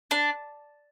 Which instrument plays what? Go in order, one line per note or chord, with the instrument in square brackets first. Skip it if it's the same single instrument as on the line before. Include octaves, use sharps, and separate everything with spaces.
[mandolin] D4